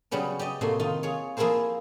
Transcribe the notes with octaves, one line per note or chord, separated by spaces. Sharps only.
C#3 F#3 G3 B3 C#4
G4 D5 D#5
A2 C3 A#3 F#4 C6
D#3 D#4 F4
F4 G#4 C#5
F3 A#3 E4 G#4 A#4 C5